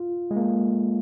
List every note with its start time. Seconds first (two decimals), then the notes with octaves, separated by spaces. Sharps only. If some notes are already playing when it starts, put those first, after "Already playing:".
Already playing: F4
0.31 G#3
0.36 A#3